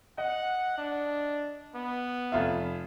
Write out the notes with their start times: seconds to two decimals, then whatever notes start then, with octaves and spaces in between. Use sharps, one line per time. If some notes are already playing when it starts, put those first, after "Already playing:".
0.18 D#5 F#5
0.78 D4
1.75 B3
2.32 F1 F4 E5